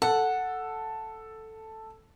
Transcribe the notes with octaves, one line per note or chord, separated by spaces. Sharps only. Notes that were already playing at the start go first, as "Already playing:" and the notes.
A4 F#5